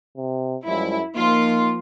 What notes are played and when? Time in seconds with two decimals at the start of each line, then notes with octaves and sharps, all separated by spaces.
0.17 C3
0.67 F#2 F3 G3 G#3 E4
1.15 F3 A#3 D#4 F4